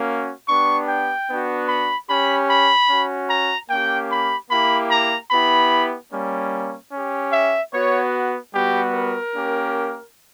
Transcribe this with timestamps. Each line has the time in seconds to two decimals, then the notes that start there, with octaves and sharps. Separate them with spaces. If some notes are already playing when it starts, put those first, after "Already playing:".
Already playing: A#3 C#4 F#4
0.49 B3 D4 G4 C#6
0.88 G5
1.29 B3 D4 F#4
1.69 B5
2.09 C#4 G4 B5
2.49 B5
2.90 C#4 F#4
3.30 A#5
3.70 A#3 C#4 G4 G5
4.10 B5
4.51 A#3 E4 G4 B5
4.91 A#5
5.31 B3 E4 G4 B5
6.12 G3 A#3 C#4
6.92 C#4 G4
7.33 E5
7.73 B3 F#4 C#5
8.54 G3 B3 F#4 G4
8.94 A#4
9.34 A#3 C#4 G4